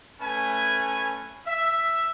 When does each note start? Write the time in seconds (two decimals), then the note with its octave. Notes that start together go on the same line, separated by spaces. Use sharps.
0.21 A3 C#4 B4 G#5
1.47 E5